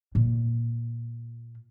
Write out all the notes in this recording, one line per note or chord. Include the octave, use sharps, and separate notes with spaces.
A#2 F4